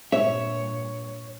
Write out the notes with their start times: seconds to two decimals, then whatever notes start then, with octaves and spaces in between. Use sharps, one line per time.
0.12 G2 A#2 C#5 E5